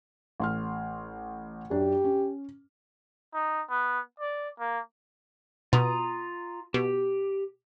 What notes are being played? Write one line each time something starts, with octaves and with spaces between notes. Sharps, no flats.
A1 C6 F6
F#2 D4 G4
C#4
D#4
B3
D5
A#3
B2 F4 A#5 D#6
B2 G4